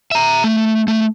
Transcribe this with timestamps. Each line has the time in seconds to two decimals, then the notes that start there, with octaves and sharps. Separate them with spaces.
0.11 E5 A#5
0.44 A3
0.88 A3